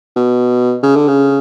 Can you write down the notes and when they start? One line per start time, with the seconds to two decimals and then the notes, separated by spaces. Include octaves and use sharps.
0.16 B2
0.83 C#3
0.96 D3
1.08 C#3